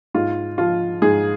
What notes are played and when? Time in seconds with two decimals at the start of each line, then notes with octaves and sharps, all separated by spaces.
0.14 G#2 F4
0.58 F3 F4
1.02 G#2 G#4